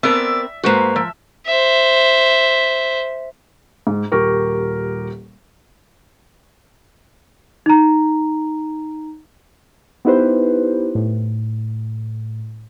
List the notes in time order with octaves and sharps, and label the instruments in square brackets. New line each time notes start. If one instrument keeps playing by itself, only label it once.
[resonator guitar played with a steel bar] B3 C4 A#4 [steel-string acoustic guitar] D5 [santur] E5
[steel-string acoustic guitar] G#2 A#3 [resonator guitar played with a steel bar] F#4 B4 C5
[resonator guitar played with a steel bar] F3 [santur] E5
[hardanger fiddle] C5 E5
[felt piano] G#2
D#1 G4 A#4 C#6
[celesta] D#4 A#5
[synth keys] B3 D#4 E4 G4 B4 C5
A2